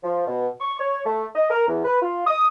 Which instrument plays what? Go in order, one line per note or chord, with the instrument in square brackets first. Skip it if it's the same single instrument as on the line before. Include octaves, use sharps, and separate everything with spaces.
[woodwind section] F3
B2
C#6
C#5
A3
D#5
A#4
E2
B4
F4
D#6